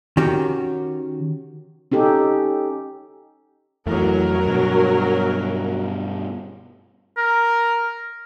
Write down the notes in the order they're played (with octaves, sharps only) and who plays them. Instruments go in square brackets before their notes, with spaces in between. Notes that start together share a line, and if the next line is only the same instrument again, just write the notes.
[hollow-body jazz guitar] D#3 C#4 F#4 G4
[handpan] C#4 D#4 G4 A4
[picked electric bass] F2 E3 A3 [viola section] F#3 A#4
[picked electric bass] G2 B2
[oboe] A#4